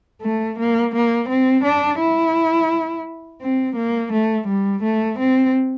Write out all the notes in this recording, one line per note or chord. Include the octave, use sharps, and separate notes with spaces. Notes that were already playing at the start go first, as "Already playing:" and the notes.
A3
A#3
A#3
C4
D4
E4
C4
A#3
A3
G3
A3
C4